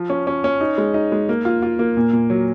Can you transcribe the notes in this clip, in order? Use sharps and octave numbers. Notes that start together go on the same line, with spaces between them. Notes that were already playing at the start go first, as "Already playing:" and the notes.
Already playing: F3
C#4
C#4
C#4
D#4
G#3
D#4
G#3
A#3
F4
F4
A#3
A#2
A#2
F#3